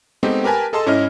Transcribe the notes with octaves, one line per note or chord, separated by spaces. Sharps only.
G#3 A3 B3 C4 D#4 G4
G4 A#4 B4 G#5 A5
G#4 A4 D#5 A5 C6 E6
G#2 C#4 E4 D#5 F6